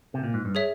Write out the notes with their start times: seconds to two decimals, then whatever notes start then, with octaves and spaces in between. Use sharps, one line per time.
0.14 C3
0.24 A#2
0.34 G#2
0.45 G2
0.55 G#4 C#5 E5